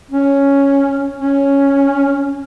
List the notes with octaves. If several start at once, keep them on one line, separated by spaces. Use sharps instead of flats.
C#4
C#4